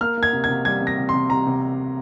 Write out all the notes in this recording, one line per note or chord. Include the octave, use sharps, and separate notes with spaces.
A#3 F6
A#3
G#6
C3
G#6
C3
G3 G#6
C3
A#6
C3
C6
C3
C3 A#5
C3